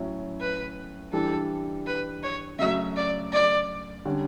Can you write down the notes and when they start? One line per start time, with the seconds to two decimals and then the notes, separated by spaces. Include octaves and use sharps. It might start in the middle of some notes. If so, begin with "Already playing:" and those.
Already playing: A2 F#3 C#4 E4
0.40 B4
1.13 E3 G3 D4 A4
1.86 B4
2.23 C#5
2.59 C#3 F#3 A3 E5
2.96 D5
3.33 D5
4.05 D3 G3 C#4